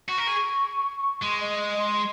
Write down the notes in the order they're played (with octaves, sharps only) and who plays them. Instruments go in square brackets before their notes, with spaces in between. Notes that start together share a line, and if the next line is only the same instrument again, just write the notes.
[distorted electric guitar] F#4 [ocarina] C#6
[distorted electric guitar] A#4
G#4
[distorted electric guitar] G#3 [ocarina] C6
[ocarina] D#5
D#5
C6